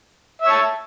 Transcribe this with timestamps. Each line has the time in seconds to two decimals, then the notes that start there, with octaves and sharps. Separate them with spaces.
0.42 E5
0.46 C#5
0.50 A5